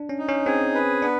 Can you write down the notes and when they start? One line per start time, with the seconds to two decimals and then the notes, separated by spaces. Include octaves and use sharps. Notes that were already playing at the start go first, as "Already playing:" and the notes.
Already playing: D4
0.09 C#4
0.18 D#4
0.28 C#4
0.46 C4 G#4
0.75 B4
1.02 B3 D4